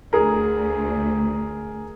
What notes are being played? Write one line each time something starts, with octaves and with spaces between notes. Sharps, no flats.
D2 G#4 A#4